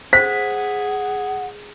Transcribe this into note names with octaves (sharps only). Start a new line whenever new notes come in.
G#4 C5 F#5 B6